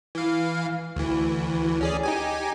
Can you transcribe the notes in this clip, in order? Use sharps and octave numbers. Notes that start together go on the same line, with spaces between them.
E3 F5
D2 E3
C#4 G#4 D5
D#4 G4 G#5